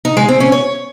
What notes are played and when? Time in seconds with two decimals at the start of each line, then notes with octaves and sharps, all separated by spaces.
0.05 D#4
0.17 G#3
0.28 C4
0.40 C#4
0.52 C#5